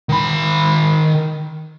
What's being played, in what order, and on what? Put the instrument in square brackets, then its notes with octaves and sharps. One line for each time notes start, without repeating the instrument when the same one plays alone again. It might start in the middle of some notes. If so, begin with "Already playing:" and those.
[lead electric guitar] D#3 B5